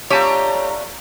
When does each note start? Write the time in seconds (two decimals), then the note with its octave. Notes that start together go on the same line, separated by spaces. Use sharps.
0.10 A3 D4 F4 G4 C#5 A5 A#5